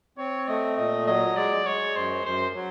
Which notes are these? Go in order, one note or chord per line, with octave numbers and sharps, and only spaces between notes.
C4 C#5
A3 D#5
A#2 D#5
F#3 D#5
G#3 D5
G#3 C#5
F#2 C5
F#2 C5
F#3